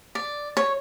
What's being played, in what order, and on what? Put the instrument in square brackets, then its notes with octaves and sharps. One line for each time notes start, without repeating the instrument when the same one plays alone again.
[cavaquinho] D5
C#5